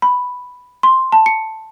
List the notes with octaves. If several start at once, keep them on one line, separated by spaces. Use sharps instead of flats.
B5
C6
A5
C#7